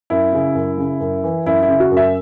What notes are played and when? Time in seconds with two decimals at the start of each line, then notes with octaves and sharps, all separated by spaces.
0.10 F#2 E4
0.33 C#3
0.55 F#2
0.78 C#3
1.00 F#2
1.24 E3
1.46 F#2 E4
1.63 E4
1.68 C#3
1.80 F#4
1.91 F#2
1.97 E5